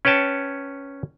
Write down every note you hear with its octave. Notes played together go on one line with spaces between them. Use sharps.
C#4 B4 C#5 G5 A5